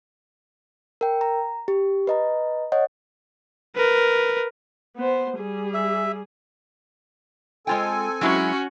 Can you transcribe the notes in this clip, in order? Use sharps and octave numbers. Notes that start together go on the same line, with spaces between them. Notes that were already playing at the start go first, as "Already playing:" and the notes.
A#4 G5
A#5
G4
B4 D#5 A#5
C#5 D#5 F#5
A#4 B4
B3 C5
G3 G#4
E5
G#3 C4 F4 A4 G5 G#5
F#3 G#3 C#4 E4 F#4